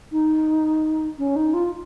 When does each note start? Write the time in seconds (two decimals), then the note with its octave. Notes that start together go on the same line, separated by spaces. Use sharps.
0.12 D#4
1.18 C#4
1.36 D#4
1.54 F4